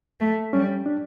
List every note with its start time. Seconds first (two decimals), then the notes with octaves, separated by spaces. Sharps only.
0.20 A3
0.53 G3 C#4
0.86 D4